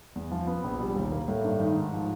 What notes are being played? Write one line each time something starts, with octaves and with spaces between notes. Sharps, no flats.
E2
F3
B3
A#1
G3
D#2
A#3
A2
G2
D#3
G#2
F3